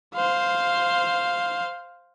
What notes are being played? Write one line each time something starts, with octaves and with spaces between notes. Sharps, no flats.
C5 F5